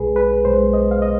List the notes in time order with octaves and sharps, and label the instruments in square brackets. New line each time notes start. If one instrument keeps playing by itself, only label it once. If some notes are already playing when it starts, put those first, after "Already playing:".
Already playing: [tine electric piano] B1 B2 G#3 [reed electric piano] G#4 B4
[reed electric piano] B4
[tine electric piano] B1 B2 G#3 [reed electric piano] C5
[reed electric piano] D#5
F5
D#5